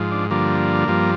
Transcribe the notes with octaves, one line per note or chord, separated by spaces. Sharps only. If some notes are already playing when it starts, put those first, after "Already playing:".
Already playing: G#2 F3
D4
G2 D3 F3 A#3
G2 F3